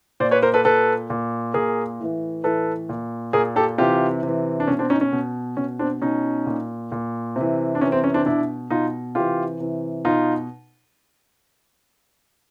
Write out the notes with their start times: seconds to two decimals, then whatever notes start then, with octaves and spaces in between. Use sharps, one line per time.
0.20 A#2 C5 D5
0.31 B4 C#5
0.42 A#4 C5
0.54 A4 B4
0.65 A#2 A4 B4
1.10 A#2
1.54 A#2 G#4 A#4
2.00 A2 E3
2.44 A2 E3 A4 B4
2.89 A#2
3.33 A#2 G#4 A#4
3.56 G4 A4
3.78 C3 E3 F4 G4
4.23 C3 E3
4.60 D4
4.67 B2 C#4
4.79 C4 D4
4.90 C#4 D#4
5.01 C#4
5.12 B2
5.57 B2 C#4
5.79 C4 D4
6.02 B2 C#4 D#4
6.46 A#2
6.92 A#2
7.36 C3 E3
7.75 D4
7.81 C3 E3 C#4
7.92 C4
8.04 C#4
8.14 C4 D4
8.26 B2 D4 E4
8.70 B2 D#4 F4
9.15 C3 E3 F4 G4
9.60 C3 E3
10.05 B2 D#4 F4